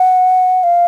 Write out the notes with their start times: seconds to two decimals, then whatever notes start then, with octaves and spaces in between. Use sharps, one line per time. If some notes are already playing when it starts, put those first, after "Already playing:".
Already playing: F#5
0.63 F5